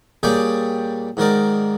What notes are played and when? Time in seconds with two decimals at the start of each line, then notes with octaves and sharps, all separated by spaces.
0.23 A#2 G3 G#4 C#5 D5 G5
1.17 G#2 D#3 A#4 D5